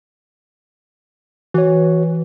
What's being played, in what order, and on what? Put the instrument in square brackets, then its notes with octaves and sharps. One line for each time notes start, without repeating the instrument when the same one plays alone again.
[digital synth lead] E3 [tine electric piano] F#4 C#5